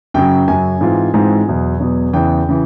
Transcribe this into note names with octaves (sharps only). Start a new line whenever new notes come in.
F#2 C#3 F#3 G5
F#2 C#3 F#3 G#5
G#2 E3 G#3 C4 F4
G#2 E3 G#3 C4 F4 G#5
E2 B2 F#3 B3
E2 B2 F#3 B3
E2 C#3 E3 G5
C#3 E3